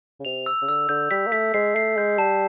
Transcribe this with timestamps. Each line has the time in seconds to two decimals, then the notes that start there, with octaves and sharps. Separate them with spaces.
0.20 C#3
0.25 C3 F7
0.46 E6
0.62 C#3
0.68 D3 E6
0.89 D3 G6
1.11 G3 B6
1.27 A#3
1.32 A3 B6
1.54 G#3 C7
1.75 A3 C7
1.97 G#3 G6
2.18 G3 A5